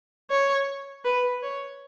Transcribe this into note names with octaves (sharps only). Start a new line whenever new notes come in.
C#5
B4
C#5